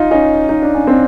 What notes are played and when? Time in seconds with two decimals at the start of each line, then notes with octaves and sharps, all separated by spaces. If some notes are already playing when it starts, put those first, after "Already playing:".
Already playing: D#4 F4
0.11 C#4 D#4
0.49 D#4
0.62 D4
0.75 C#4
0.87 C4 D4